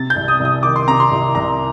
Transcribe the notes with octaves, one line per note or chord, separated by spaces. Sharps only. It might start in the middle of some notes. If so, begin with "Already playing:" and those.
Already playing: C3 A6
G6
C2
D#6
C2
D#6
D#3 D6
C6
C3 A#5
C6
C2
C2 A#5